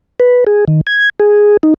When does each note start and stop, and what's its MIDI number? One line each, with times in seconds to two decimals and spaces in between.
0.20 0.44 71
0.47 0.65 68
0.68 0.81 51
0.87 1.10 92
1.20 1.57 68
1.63 1.74 63